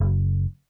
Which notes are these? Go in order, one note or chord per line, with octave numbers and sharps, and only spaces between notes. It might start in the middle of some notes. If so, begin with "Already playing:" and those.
F#1